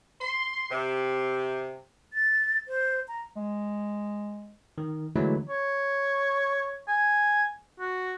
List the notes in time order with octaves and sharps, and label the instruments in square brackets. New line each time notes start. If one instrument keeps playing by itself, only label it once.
[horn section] C6
C3
[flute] A6
C5
A#5
[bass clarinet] G#3
[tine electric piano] D#3
D3 E3 F#3 G#3 A3 E4
[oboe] C#5
G#5
F#4